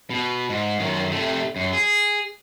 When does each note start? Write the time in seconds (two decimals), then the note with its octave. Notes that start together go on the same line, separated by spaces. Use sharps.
0.10 B2
0.49 G#2
0.80 F#2 D#3
1.12 C3 A3
1.56 F#2
1.73 G#4